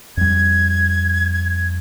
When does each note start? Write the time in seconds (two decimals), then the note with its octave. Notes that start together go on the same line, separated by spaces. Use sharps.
0.17 F2 G3 G#6